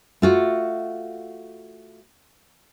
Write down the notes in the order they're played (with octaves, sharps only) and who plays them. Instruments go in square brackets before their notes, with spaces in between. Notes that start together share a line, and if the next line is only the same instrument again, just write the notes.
[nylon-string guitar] A3 F4 F#4